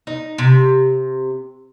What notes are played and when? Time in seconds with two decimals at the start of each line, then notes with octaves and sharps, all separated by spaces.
0.07 D#4
0.38 C3